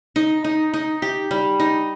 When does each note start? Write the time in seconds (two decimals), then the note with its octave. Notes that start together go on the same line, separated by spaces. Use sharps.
0.16 D#4
0.44 D#4
0.74 D#4
1.02 G4
1.31 G3
1.60 D#4